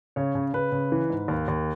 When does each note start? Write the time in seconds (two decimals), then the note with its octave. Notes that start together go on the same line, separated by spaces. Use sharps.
0.16 C#3 C#5
0.35 C#3
0.53 C#3 B4
0.72 C#3
0.92 E3
1.10 G#2
1.28 D#2
1.48 D#2